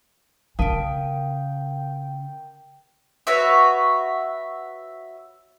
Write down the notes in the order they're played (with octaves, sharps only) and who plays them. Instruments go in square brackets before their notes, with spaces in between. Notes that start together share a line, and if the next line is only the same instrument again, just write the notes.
[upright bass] C#3 [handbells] A#4 A5 D#6 [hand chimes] F5 D7 [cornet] G5
[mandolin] F#4 B4 C#5 E5